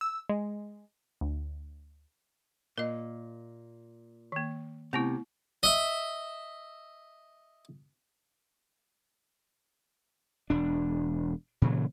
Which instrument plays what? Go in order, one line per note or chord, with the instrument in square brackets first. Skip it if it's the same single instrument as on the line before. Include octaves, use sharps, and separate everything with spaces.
[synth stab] E6
G#3
D2
[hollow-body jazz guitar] A#2 [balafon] A#4 D#5
[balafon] D#3 A#3
[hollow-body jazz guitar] C3 [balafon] A3 B3 E4
[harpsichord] D#5 E5
[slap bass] E1 D4
A#2 C#3 E3 F#3